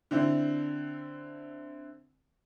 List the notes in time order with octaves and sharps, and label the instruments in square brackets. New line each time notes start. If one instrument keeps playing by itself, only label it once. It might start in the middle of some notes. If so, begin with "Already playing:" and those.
[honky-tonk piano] D3 C4 E4